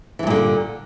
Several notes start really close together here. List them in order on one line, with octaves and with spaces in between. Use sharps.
E3 G2 A#2 D3